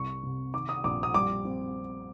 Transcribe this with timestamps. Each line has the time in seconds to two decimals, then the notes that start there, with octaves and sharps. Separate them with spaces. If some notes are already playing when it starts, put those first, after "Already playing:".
Already playing: C2 C#6
0.23 C3
0.54 D#3 D6
0.69 D#6
0.84 A#1 D6
1.03 D#6
1.14 G3 D6
1.45 C4